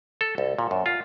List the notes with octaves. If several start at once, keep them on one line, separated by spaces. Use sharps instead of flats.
A4
C2
A#2
F#2
F4